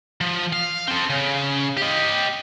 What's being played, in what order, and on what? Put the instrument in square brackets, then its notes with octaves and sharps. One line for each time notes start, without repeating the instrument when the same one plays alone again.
[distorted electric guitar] F3
F5
C4 A4
C#3
G4 D#5